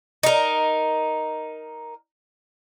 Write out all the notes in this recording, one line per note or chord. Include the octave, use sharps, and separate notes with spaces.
D#4 A#4